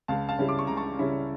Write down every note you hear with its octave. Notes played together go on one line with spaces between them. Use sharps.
C#2 F5 A5
F5 A5
C#3 G3 C#4 E4
D6
C#6
C#2 A#5
A5 C#6
C#3 G3 C#4 E4